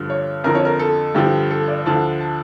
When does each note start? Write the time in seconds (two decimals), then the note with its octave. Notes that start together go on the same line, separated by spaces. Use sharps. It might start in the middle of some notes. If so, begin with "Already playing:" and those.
Already playing: G2 D3 F3
0.10 C#5
0.44 F2 D3 F3 A#4
0.55 C#5
0.65 A#4
0.79 A4
1.15 G2 D3 F3 G4
1.51 A4
1.68 D5
1.86 D2 D3 F3 A5
2.21 A5